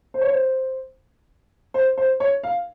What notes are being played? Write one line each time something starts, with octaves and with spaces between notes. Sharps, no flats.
C5
C#5
C5
C5
C5
C#5
F5